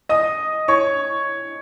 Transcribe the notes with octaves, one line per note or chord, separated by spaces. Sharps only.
D#5 D#6
C#5 C#6